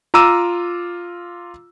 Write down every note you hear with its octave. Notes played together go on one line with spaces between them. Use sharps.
F4 A#5 D6 E6 D#7